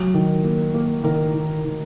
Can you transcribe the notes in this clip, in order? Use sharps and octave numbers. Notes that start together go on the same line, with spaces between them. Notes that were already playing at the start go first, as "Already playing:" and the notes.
Already playing: F#3
D#3
A#3
A#3
D#3 A#4
D#3
D#3